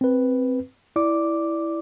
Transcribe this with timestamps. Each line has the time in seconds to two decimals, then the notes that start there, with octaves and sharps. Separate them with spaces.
0.01 C4 B4
0.96 E4 D5 D6